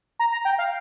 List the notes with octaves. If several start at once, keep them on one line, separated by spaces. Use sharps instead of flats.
A#5
A#5
G5
F5